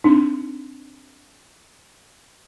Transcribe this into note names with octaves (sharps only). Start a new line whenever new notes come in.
C4 D4 D#4